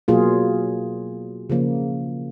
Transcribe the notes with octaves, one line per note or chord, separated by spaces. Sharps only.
B2 F#3 A#3 F4 G#4
C#3 F3 A#3